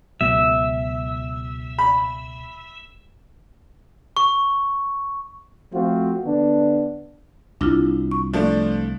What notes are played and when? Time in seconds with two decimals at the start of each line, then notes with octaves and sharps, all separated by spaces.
0.21 C#2 B2 F#3 E5
1.78 B5
4.17 C#6
5.73 F3 A3 C4 F4 F#4
6.25 D3 B3 D4
7.61 C2 D4 E4 F4
8.11 C#6
8.33 F3 A3 D4